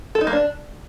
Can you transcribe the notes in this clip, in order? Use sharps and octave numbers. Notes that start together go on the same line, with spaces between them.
A4
D#4
A#3
D4